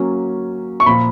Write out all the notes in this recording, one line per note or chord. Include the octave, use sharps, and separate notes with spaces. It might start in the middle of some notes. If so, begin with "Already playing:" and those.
Already playing: F#3 A#3 C#4
C#6
A#2 F3 A#3 B5